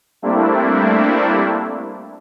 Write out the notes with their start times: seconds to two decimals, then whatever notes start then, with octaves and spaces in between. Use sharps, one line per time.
0.22 G3 A3 A#3 C4 D4 E4